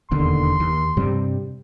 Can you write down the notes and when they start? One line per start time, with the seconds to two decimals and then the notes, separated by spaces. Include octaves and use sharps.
0.11 E1 D#2 D3 C6
0.60 D#2
0.97 G2 C3 G3